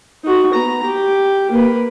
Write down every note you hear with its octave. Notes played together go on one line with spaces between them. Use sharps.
D#4 F#4
B3 A#5
G4
A#3 B4